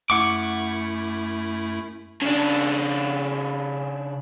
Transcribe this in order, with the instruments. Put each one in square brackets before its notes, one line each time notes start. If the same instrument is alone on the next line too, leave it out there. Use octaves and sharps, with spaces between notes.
[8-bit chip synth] F#2 A3 E4 [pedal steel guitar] F#5 C#6 D6
[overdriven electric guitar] C#3 D4